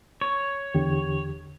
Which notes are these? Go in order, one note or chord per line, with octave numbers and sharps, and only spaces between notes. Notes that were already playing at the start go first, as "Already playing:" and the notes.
C#5
E2 D3 G4